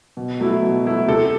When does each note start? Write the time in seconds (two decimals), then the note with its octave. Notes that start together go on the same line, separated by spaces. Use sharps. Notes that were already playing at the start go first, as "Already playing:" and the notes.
0.17 B2
0.40 F#3 A3 E4
0.63 B2
0.85 F#3 A3 E4
1.08 C3 A4